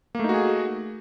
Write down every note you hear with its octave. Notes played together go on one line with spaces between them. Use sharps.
A3 A#3 D#4 F#4 G#4